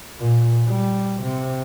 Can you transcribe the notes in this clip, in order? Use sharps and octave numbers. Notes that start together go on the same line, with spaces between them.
A#2
G3
C3